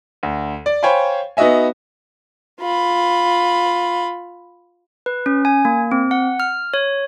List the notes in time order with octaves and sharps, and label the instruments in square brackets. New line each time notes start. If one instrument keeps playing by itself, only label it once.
[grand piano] D2
D5
C5 C#5 F5 G5 G#5 B5
B3 D#4 F#4 D#5 E5 G#5
[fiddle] F4 B5
[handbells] B4
C#4
G#5
A#3
C4
F#5
F6
C#5